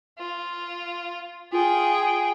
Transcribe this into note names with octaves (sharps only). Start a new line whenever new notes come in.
F4
F4 G#4 G5